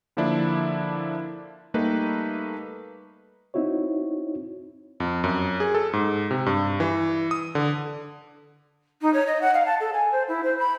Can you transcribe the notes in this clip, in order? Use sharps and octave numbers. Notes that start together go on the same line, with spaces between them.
D3 F3 A#3 D4 E4
G3 A3 A#3 D#4 B4
C4 D#4 E4 F#4 C#5
F2
F#2
G#4
A4
G#2
C3
G2
E3
D#6
D3
D#4
C#5
D#5
F#5
F5
A5
A4
G#5
C5
E4
C5
B5